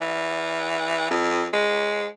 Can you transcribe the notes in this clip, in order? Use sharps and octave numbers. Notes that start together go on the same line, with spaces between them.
E3
F2
G#3